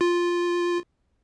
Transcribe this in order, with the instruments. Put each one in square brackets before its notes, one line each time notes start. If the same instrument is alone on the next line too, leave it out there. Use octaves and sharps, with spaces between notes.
[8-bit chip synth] F4